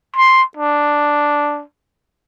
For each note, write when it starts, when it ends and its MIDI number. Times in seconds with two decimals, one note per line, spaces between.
0.16 0.43 84
0.57 1.62 62